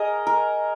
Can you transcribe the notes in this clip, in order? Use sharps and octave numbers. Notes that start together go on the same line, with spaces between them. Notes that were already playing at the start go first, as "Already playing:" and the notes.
Already playing: G#4 A#4 D#5
A#4